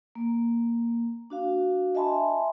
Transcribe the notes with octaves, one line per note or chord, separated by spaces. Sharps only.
A#3
D4 F#4 F5
D#5 E5 G#5 A5 B5 C6